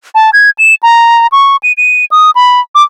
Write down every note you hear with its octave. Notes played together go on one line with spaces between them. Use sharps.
A5
G#6
E7
A#5
C#6
D#7
D#7
D#6
B5
D6